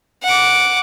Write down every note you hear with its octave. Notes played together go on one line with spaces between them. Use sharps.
F#5 D6